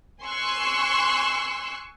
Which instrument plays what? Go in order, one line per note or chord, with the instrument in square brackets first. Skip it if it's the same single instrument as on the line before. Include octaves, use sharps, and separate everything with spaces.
[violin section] G#5 C6 C#6 E6 F#6